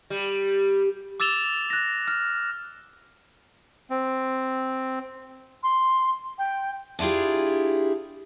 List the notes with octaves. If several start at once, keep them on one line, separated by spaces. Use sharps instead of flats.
G3
D6 E6 A6 E7 F7 G7
F#6 A#6
F6
C4
C6
G5
D4 E4 F4 G4 G#4